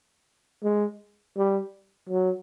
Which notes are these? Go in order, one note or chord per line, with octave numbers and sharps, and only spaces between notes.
G#3
G3
F#3